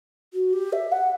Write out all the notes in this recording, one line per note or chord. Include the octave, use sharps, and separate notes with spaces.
F#4
G4
E5
F#5